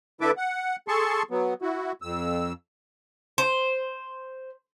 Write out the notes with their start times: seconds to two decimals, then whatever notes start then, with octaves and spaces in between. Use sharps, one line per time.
0.21 D3 E4 A4 B4 E5 D6
0.37 F#5
0.88 G#4 A4 A5 C6 C#6
1.31 F#3 B3
1.62 E4 F#4
2.02 F2 E6
3.38 C5